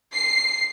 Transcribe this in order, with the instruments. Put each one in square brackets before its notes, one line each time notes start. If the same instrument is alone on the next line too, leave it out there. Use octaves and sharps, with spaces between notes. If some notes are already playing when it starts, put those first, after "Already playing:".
[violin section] C7